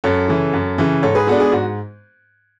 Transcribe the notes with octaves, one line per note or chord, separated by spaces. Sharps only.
F#2 A4 C#5
C#3 E3
F#2
C#3 E3
G#2 A4 C#5
G#4 B4
G#3 B3 D4 F#4 A4
G#4
G#2 F#4